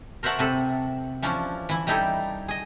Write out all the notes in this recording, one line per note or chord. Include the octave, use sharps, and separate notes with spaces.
A#4 C5 C#5 E5 F#5 A5
C3 A4 B5
E3 F3 C#4 D4
E3 E4
G3 D#4 E4 G4 A4
G#4 D#5